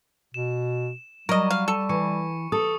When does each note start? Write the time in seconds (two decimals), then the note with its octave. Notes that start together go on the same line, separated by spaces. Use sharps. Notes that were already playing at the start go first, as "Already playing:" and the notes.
0.34 B2 E7
1.29 F#3 G3 A#4 D#5 C#6
1.50 F5
1.68 A4
1.89 E3 C#6 C#7
2.52 A4 D#6